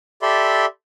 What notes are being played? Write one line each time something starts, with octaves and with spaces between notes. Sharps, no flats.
G4 A4 D5 E5 B5 C6